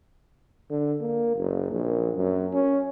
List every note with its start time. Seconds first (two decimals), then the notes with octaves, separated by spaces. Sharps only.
0.70 D3
1.01 A#3
1.36 F#1
1.71 A#1
2.15 F#2
2.54 C#4